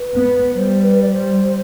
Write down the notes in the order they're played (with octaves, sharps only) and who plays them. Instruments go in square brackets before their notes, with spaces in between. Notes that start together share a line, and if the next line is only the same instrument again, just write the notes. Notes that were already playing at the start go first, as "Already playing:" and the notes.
Already playing: [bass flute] B4
[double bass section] B3
[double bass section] G3 [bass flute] C5
[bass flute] B4
D5
C5